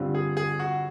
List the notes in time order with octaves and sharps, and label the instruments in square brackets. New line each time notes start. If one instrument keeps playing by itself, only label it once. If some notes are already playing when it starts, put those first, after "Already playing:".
Already playing: [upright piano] G2 D3 G3 C4 F4
[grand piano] G#4
G#4
F#4